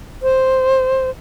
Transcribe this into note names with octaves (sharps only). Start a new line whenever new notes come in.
C5